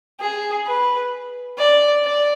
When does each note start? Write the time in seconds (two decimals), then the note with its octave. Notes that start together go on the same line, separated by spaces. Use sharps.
0.20 G#4
0.66 B4
1.58 D5
2.04 D5